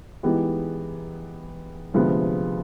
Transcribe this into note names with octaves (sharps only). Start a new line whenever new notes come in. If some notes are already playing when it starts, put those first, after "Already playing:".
E3 G#3 B3 D#4 G4
D2 C3 F3 G#3 B3